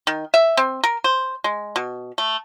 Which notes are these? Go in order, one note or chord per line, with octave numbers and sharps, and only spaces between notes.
D#3
E5
C4
A#4
C5
G#3
B2
A3